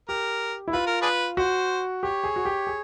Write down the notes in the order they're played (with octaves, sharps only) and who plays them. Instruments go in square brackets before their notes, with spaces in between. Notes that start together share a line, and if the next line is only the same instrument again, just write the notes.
[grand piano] G4 [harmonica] A#4
[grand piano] E4
[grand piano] F4 [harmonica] B4
[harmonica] A#4
D4 G#4 B4
[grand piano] F#4 [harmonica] C5
[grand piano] G4 [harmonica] C#5
[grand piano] G#4
F#4
G4
G#4